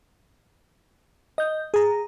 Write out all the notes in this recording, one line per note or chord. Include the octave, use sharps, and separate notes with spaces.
D#5 G6
G#4 A#5